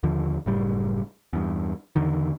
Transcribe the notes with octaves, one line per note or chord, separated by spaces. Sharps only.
D#2 D3 F3
F#1 A2 G3
E2 G2
E2 D3 D#3